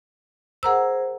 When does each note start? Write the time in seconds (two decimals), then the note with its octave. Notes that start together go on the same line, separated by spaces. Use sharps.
0.63 G#4 A#4 C5 F#5 A#5 E6